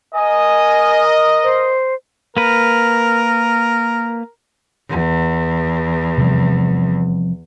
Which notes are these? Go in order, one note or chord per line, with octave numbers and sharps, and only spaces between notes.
A#4 D#5 G#5
C5
A#3 A#4 B4
E2
C3 F3 G3